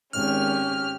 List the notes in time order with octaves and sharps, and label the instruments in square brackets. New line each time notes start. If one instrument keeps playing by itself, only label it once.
[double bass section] G#1 [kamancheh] C#4 G4 [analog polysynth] F6